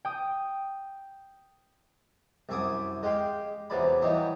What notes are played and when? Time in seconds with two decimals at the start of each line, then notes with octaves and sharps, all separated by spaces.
0.05 G5 D#6
2.49 C2 F#2 E5 G#5 D6 D#6
3.03 G#3 G4 F5 G5
3.70 E2 C3 E3 F#3 D5 B5
4.01 E3 F#3 G3 D#4 E4